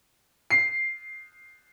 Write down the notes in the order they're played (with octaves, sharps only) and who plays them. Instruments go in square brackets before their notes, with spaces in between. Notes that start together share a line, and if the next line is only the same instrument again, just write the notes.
[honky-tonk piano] C7